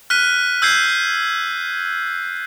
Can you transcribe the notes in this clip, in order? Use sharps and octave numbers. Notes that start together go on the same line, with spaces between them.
F6 F#6 B6 D#7
E6 G6 G#6 C7